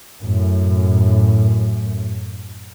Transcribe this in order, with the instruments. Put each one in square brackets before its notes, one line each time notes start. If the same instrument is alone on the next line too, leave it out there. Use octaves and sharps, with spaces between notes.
[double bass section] F#2 A2